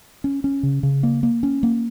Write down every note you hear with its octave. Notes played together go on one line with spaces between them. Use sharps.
C#4
C#4
C#3
C#3
A#3
A#3
C#4
A#3